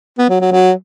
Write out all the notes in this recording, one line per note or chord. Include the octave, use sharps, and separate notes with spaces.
B3
F#3
F#3
F#3